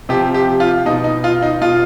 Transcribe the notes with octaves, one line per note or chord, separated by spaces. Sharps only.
C3 F3 G4
G4
F4
B2 D#4
D#4
F4
D#4
B2 F4